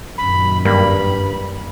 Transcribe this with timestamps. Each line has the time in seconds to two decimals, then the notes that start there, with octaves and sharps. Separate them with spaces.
0.18 F#2 A#2 D#3 B5
0.65 G2 G3 A#3 B5